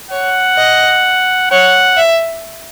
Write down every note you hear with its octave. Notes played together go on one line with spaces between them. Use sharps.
C#5 F#5
D#5
C#5 F#5
E5